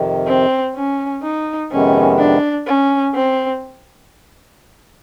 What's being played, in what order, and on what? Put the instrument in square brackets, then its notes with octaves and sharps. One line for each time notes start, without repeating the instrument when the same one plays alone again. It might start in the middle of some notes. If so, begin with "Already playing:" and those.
Already playing: [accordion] F2 C3 D#3
[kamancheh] C4
C#4
D#4
[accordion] F2 C3 D#3 G#3 B3 [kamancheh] C#4
[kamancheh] D4
C#4
C4